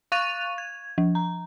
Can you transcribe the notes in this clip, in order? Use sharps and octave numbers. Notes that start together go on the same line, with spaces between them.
F5 C#6 F#6 A6 D#7 F7
G#6
F3
A#5